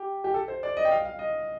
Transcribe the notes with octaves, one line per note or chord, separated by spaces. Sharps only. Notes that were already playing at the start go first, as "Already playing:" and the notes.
Already playing: G4
G4
A4
C5
D5
D#5
G5
F5
F5
D#5